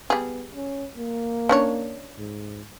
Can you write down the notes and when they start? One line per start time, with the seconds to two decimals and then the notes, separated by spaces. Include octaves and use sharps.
0.10 G3 B3 G#4
0.55 C#4
0.97 A#3
1.49 C#4 D4 C#5
2.18 G#2